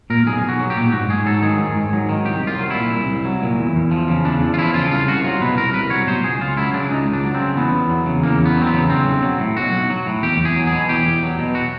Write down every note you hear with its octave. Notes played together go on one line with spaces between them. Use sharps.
A#2 A#4
B1 G#4
B1
F#4
F#3
G4
A#2
G#2 F#4
G#2 G#4
F#3 A4
D#3 G#4
G#2
G#2
F#3
D#3
C2 G4
C2 F4
F#3
A#2 E4
C2
C2
F#3
A#2
E2
E2
F3
C#3
E2 D4
E2
F4
F3 E4
C#3 F4
C2 F4
C2 F#4
F#3 F4
B2 B4
C2 A#4
C2 B4
F#3 C#5
B2 C5
C#2 G#4
C#2 F4
F#3 E4
C#3 D4
C#2 D#4
C#2
D4
F#3
C4
C#3
E2 B3
E2
F#3
C#3
E2 A#3
E2 B3
F#3 C4
B3
C#3
B1 C4
B1
F#3
A2
B1 F#4
B1
F#3
A2
E2 G4
E2
G#4
F#3
G#4
B2
E2 G4
E2
F#3
B2
F#4